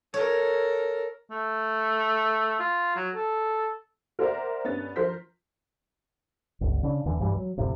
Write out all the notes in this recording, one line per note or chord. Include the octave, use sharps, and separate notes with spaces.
A4 A#4 C#5
A3
F4
F#3
A4
A#4 C5 D5 E5 F#5 A#5
G2 B3 C#4 A6
F3 A#4 C5 G6 B6
G1 C#2
C#3 D4
E2 D3 E3
B1 G2 E3 G3
F#3
A#1 F2 A2 C3